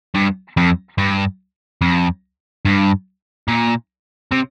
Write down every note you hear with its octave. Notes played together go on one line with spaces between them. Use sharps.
G2
F2
G2
F2
G2
A#2
C3